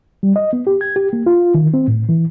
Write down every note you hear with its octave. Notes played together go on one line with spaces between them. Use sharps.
G3
D#5
B3
G4
G#6
G4
A#3
F4
D#3
C4
A2
E3